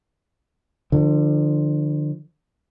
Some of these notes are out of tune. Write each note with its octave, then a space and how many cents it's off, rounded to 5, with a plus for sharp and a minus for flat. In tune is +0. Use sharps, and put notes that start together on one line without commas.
D3 +30 F3 +0